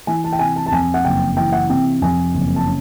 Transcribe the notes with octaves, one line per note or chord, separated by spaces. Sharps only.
E3 G#5
A5
G5
C3 G#5
A5
A5
F2 G#5
F#5
F#1 G5
E3 G5
F#5
C3 G5
F2 G#5
F#1
A5
C#4